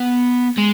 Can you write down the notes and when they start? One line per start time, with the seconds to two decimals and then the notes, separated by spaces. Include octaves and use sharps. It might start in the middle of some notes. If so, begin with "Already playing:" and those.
Already playing: B3
0.57 G#3